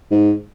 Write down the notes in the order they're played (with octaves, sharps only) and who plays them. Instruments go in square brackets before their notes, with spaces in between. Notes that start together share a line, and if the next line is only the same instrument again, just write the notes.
[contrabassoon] G#2